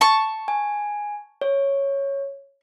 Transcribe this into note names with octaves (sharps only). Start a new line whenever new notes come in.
A5 C#6
G#5
C#5